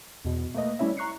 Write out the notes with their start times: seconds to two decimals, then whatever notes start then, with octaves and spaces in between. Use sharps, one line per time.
0.25 E2 B2
0.54 A3 A#3 B4 D#5
0.79 G3 A3 C#4 E4 C#5 E5
0.97 A#5 C#6 F#6 C7 C#7